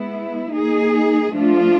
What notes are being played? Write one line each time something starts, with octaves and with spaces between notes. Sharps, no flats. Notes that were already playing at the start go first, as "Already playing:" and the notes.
Already playing: G#3 B3 E4
A#3 D#4 G#4
F3 A3 D4 F4